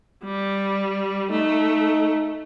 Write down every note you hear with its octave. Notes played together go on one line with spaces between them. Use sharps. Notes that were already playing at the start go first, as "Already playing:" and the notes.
G3
A3 D#4